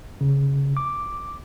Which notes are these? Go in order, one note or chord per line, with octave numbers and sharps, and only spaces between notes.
C#3
D6